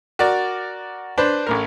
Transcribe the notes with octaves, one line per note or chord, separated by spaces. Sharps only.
F#4 A#4 D5
D4 B4 C5
A1 A2 A#4